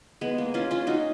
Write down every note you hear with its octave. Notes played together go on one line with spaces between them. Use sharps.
G#3 B3
A#3
C#4 F4
C#4 F4
D#4 F#4